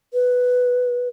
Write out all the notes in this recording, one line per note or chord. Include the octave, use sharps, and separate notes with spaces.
B4